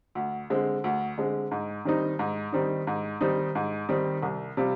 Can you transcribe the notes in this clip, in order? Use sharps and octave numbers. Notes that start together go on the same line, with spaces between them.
D2
D3 G#3 C4
D2
D3 G#3 C4
G#2
D#3 G3 C4 D#4
G#2
D#3 G3 C4 D#4
G#2
D#3 G3 C4 D#4
G#2
D#3 G3 C4 D#4
C2
C3 G3 C4 F4